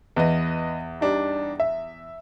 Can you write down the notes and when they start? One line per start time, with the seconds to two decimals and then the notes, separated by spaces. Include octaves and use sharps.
0.16 E2 B4 D#5
1.01 G3 D4 D#4
1.60 E5